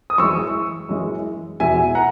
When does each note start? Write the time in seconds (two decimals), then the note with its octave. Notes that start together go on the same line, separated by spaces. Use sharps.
0.10 D#6
0.18 F#2 E3 G#3 C#6 E6
0.89 F#2 E3 G#3
1.60 E2 B2 G#3 E5 G#5
1.95 F#5 A#5